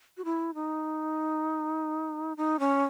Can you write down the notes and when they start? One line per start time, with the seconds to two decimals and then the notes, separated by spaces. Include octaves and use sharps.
0.17 F#4
0.25 E4
0.54 D#4
2.37 D#4
2.59 C#4